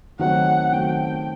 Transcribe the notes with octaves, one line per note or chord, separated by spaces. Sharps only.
D#3 F#3 A3 C4 F#4 F#5
D#3 F#3 A3 C4 F#4 G5